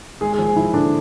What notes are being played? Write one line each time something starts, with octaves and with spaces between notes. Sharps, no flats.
G#3 G#4
G#4
F3
G#4
F3 E4
D3 D4